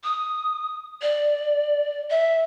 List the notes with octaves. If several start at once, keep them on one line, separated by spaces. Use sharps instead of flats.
D#6
D5
E5